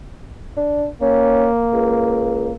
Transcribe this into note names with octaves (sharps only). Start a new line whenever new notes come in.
D4
A#3 C#4
C#2